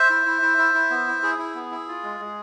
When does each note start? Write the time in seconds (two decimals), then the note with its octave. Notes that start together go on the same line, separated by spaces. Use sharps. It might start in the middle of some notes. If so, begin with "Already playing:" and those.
Already playing: C5 E5
0.10 E4
0.26 E4
0.42 E4
0.58 E4
0.74 E4
0.90 B3
1.07 E4
1.23 E4 G#4
1.39 E4
1.55 B3
1.71 E4
1.88 F4
2.03 G#3
2.20 G#3